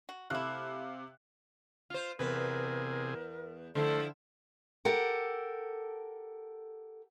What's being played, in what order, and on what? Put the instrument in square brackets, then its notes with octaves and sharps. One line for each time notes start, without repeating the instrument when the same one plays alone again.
[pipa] F#4
[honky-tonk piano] C3 F5 F#6 [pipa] A3 E4
[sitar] F4 C5 [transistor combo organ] F6
[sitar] E2 B3 B4 [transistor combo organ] C3 G#4 [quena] A#4
[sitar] D3 F3 E4 [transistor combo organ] A3 C5 [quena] A4
[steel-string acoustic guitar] G4 A4 A#4 F#5